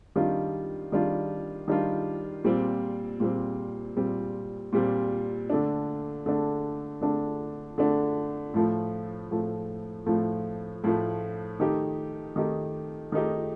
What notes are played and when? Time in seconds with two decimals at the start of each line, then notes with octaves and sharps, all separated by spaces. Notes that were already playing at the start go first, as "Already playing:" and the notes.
0.16 D#3 G3 D4 F4
0.92 D#3 G3 D4 F4
1.68 D#3 G3 D4 F4
2.44 A#2 G3 C4
3.20 A#2 G3 C4
3.96 A#2 G3 C4
4.73 A#2 G3 C4
5.50 D3 A3 D4
6.26 D3 A3 D4
7.01 D3 A3 D4
7.78 D3 A3 D4
8.54 A2 F3 A3
9.31 A2 F3 A3
10.06 A2 F3 A3
10.84 A2 F3 A3
11.60 D#3 A3 D#4 G4
12.36 D#3 A3 D#4 G4
13.12 D#3 A3 D#4 G4